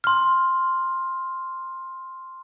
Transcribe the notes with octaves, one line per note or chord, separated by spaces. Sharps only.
C6 F6